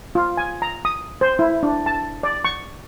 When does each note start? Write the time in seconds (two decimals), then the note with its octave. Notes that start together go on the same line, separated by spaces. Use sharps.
0.15 F4
0.37 G#5
0.62 A#5
0.85 D#6
1.21 C5
1.39 E4
1.63 D4
1.86 A5
2.23 D5
2.45 C#6